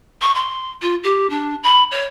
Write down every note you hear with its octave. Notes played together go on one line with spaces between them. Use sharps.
C#6
C6
F4
G4
D4
B5
C#5